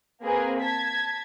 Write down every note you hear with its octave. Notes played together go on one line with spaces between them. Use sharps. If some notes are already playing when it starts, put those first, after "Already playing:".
A#3 C4 G#4 A#4 B4
A5 G#6 B6